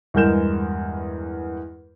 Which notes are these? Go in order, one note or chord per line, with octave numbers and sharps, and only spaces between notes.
E2 G2 G#3 A#4 G6 E7